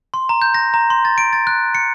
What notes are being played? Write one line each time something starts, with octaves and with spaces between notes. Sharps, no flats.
C6
A#5
G6
A#6
A#5
C6
A6
D7
A6
F#6
C#7